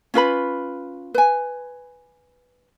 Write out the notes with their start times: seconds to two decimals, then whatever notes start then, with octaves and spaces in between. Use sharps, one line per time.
0.14 C#4 F4 B4 B5
1.14 B4 G#5